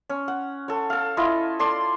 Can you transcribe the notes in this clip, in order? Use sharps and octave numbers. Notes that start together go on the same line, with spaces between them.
C#4
F#5
A4 C#5
A4 F5
E4 F4 D#5
A4 D5 C6